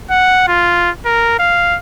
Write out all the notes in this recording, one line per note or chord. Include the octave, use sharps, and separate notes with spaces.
F#5
F4
A#4
F5